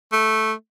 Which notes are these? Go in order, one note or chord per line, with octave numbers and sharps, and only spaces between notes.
A3